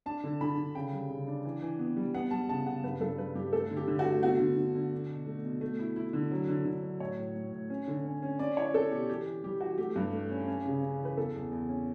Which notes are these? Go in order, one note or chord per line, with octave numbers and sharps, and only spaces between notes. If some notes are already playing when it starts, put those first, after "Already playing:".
D4 A5
D3
D3 B5
D3
C#3 G5
G3
C#3
D4
E3
E3
B3
G3
B3 F#5
G3 A5
C#3 A5
C#3 F#5
G2 B4
G2 A4
G3 B4
G2 G4
A3 A4
D3
G4
D3
F#4
A3
B3 F#4
D3
D3
D3
D4
B2
A3
B2
A3
E4
E4
D3
F#3
D3
D3
F#3
A2 C#5
A2
A2
A2
C#4
D3
C#4
C#4
C#4 D5
E4 C#5
C#4 A4
B2 G4
E3 G4
E3
G3 G4
E3 F#4
A3 G4
G2
A3
C#4
C#4
C#3
C#4
E3
B4
E2 A4
E2
E2
C#4